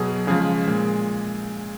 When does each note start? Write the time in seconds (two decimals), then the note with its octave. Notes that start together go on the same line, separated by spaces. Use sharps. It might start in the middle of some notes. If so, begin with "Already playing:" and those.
Already playing: B2 F#3 G#4
0.27 C#3 F3 G#3 G#4
0.68 A#2 G#3